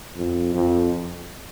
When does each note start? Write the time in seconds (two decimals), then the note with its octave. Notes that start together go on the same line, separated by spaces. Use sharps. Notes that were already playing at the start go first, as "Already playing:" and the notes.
0.17 F2
0.55 F2